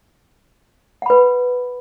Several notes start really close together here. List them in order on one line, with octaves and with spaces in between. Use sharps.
F#5 B5 B4